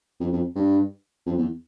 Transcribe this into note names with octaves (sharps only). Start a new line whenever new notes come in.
F2
F2
G2
F2
E2